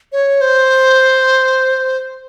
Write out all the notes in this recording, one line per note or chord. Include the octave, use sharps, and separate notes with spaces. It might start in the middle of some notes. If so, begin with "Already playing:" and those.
C#5
C5